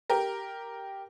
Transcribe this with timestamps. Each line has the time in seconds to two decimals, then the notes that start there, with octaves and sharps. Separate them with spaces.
0.10 G4 A#4